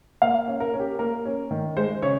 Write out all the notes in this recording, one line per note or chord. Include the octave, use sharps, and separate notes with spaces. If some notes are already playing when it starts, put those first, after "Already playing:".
A#3 F5
C#4
A#4
C#4
G4
A#3 A#4
C#4
D#3
G#3 C5
C#3 C#5